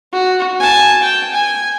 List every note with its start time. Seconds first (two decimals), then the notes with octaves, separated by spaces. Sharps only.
0.12 F#4
0.60 G#5 A5
1.02 G5
1.34 G#5